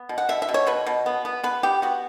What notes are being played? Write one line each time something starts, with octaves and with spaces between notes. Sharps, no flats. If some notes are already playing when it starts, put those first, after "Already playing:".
Already playing: B3
B2
F#5
B2 E5
E5
B2
C#5
B2 B4
B2
B3
B3
B3 B4
B3 G4
B3 F#4